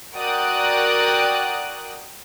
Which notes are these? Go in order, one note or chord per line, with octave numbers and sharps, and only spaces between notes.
F#4 A#4 D5 G5 D#6 F#6